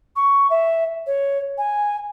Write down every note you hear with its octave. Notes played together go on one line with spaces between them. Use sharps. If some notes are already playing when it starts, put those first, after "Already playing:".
C#6
E5
C#5
G#5